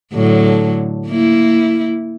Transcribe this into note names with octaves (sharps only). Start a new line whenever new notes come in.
A2 D3 F#3
A#3 E4